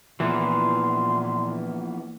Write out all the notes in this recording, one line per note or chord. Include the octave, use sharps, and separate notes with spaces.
A#2 E3 F3 A#3 B3 C6